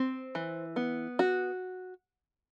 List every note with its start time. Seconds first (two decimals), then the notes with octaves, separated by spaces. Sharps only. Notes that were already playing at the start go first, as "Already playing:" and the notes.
Already playing: C4
0.35 E3
0.76 B3
1.19 F#4